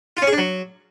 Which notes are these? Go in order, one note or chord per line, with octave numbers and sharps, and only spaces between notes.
F4
C#4
G#4
D4
F#3